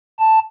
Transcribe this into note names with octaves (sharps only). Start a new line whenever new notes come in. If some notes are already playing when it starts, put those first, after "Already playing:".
A5